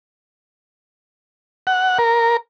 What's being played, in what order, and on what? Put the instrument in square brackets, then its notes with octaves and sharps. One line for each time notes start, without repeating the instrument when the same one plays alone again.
[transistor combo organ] F#5
A#4